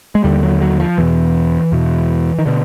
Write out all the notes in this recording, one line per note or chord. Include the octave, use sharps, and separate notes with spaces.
G#3
D#2 D3 G3
F#3
F#3
F3
E2 B2 E3
E2 B2
D#3
B2 D3